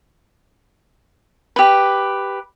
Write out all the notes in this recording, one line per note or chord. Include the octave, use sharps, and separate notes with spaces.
G4 B4